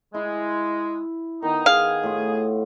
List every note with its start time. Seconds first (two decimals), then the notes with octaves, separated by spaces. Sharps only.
0.14 G#3 E4
1.42 D#3 B3 D#4
1.66 G#4 F5
2.03 A2 F4